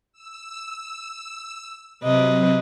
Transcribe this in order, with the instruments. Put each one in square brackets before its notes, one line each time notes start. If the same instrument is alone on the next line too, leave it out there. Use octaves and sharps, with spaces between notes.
[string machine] E6
[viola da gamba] C3 B4 D#5 [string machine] F#3 C4